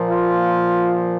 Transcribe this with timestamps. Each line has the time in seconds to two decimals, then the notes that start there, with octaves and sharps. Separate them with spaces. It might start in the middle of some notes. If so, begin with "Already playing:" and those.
Already playing: A#2 F3 A#3
0.09 F4